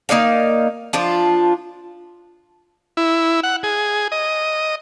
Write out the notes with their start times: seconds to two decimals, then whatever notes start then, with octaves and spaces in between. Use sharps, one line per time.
0.09 A#3 D#4 D5 F5
0.93 F3 D4 F4
2.97 E4
3.43 F#5
3.63 G#4
4.12 D#5